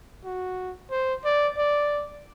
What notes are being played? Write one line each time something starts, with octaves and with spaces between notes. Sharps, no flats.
F#4
C5
D5
D5